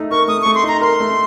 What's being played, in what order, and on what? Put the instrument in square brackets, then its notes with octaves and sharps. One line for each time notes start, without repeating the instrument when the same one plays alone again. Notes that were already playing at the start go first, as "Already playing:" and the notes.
Already playing: [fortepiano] A3 D#4
[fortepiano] A#4 [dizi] C#6
[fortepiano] A3 [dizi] D#6
[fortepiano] A3 [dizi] C#6
[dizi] C6
[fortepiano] D#4 [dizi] A#5
[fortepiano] A#4 [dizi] C6
[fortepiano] A3